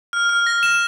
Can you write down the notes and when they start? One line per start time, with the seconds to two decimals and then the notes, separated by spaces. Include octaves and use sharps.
0.13 F6
0.29 F6
0.47 A#6
0.63 E7